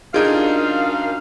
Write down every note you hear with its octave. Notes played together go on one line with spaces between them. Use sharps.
F#2 D4 D#4 F4 G4 G#4 A#4 F5